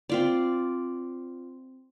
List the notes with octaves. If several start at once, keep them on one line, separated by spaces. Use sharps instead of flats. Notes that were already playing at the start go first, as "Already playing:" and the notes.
C4 F4 D5